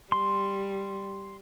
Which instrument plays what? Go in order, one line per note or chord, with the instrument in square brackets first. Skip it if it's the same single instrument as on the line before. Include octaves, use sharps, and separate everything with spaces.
[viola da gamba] G3 [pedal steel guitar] C6